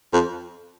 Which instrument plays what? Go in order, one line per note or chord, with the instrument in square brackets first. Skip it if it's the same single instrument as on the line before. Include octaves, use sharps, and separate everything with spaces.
[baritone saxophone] F2